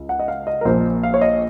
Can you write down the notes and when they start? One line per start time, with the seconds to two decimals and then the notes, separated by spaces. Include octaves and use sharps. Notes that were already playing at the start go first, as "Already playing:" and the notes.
Already playing: C#2
0.09 F#5
0.19 D#5
0.28 F5
0.47 D#5
0.61 A#4
0.65 A#1 A#2 F3 C5
1.03 F5
1.14 C#5
1.21 D#5